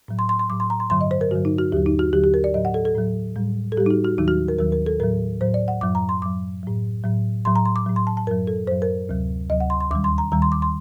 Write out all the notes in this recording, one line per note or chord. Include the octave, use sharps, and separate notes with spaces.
A2 F#3
C6
C6
C6
A2 F#3 D6
C6
A#5
C6
G2 D3 F#3 C6
D#5
C5
A#4
G2 D3 F#3 F#4
D#4
F#4
D#2 D3 F#3 G4
D#4
F#4
D#2 D3 F#3 G4
G4
A#4
D5
A2 F#3 D#5
F#5
A4
A4
A2 F#3
A2 G3
A4
A2 G3 G4
D#4
F#4
F#4
D#2 D#3 F#3 D#4
F#4
A#4
D#2 D#3 F#3 A#4
A#4
A4
A2 F#3 A#4
A2 F#3 C5
D5
F#5
F#2 F#3 D6
A#5
C6
F#2 F#3 D6
A2 F#3
A2 F#3
A2 F#3 C6
A#5
C6
D6
A2 F#3
C6
A5
A5
F#2 F#3 A#4
A4
F#2 F#3 C5
A#4
D2 C3 F#3
D2 C3 F#3 D#5
F#5
C6
C6
D#2 D#3 G3 D6
C6
A#5
D#2 D#3 G3 A#5
C6
D6
C6